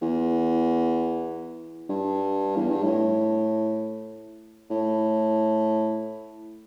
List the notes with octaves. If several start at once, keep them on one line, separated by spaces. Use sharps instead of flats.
E2
G2
E2
G2
A2
A2